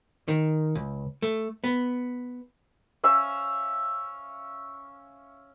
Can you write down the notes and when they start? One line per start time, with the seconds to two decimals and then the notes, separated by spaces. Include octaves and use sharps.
0.28 D#3
0.75 C#2
1.22 A3
1.64 B3
3.04 C#4 E5 F5